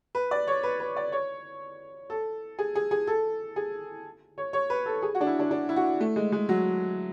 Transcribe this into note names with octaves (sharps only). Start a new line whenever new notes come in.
B4
D5
C#5
B4
B4
D5
C#5
A4
G#4
G#4
G#4
A4
G#4
C#5
C#5
B4
A4
G#4
F#4
D4
E4
D4
D4
E4
F#4
A3
G#3
G#3
F#3